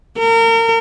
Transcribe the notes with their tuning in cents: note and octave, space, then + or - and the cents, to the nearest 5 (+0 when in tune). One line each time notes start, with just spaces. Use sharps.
A#4 -35